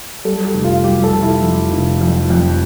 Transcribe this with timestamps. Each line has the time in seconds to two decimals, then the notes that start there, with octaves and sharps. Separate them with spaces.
0.25 G3 A4
0.45 G4
0.54 F1
0.64 F4
0.84 G3 G4
1.04 A4
1.13 F1
1.23 E4
1.42 F2
1.71 F1
2.01 F2
2.30 F2